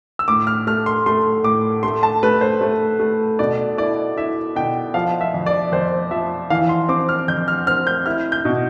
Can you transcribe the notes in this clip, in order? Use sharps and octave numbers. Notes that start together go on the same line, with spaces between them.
E6
A2 D6
F6
A3 F6
C6
A3 C6
A2 D6
A3 C6
A5
A3 B4
C5
A3
A3
B2 D5
E4 D5
E4 E5
B2 G5
F3 F5
E5
F2
D5
F2 C5
F3 E5
E3 F5
C6
C4 D6
F6
F2 G6
F6
C4 F6
G6
E4 F6
G6
B2